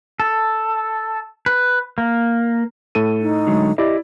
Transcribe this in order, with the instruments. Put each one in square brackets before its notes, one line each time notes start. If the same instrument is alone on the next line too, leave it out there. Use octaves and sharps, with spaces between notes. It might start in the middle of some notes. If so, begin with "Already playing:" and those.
[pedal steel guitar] A4
B4
A#3
[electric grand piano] A2 A4 D#7
[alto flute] D#4
[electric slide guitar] D3 F#3 G#3
[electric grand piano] E4 D5 [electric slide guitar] G4 D#5